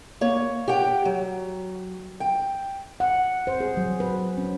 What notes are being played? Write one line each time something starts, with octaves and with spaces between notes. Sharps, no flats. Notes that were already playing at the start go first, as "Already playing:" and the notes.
A#3 C#5
G4 F#5 G5
F#3
G5
F#5
C5
G#4
F#3
B4
C#4